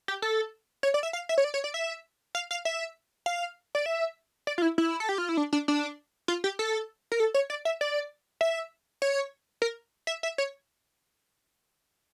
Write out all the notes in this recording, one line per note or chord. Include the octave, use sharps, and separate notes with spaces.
G4
A4
C#5
D5
E5
F5
E5
C#5
D5
C#5
D5
E5
F5
F5
E5
F5
D5
E5
D5
F4
E4
E4
A4
G4
F4
E4
D4
D4
D4
F4
G4
A4
A#4
A4
C#5
D5
E5
D5
E5
C#5
A#4
E5
E5
C#5